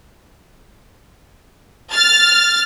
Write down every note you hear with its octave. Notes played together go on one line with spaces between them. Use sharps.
F6 A6